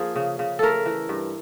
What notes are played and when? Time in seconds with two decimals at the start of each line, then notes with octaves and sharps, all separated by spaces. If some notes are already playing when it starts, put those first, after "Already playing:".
Already playing: F3 A#3 G#4
0.16 C#3
0.39 C#3
0.59 A3 A4 A#4
0.86 E3
1.09 G2